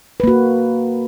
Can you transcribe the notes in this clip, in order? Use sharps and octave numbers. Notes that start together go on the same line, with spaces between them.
A#3 F#4 B4